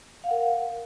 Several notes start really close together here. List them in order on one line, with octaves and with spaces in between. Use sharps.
F5 F#5 A#4